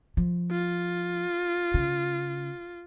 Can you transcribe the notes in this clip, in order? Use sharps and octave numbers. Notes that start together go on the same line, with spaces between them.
F3
F4
C#3